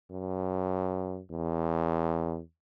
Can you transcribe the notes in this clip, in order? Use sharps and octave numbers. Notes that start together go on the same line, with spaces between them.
F#2
E2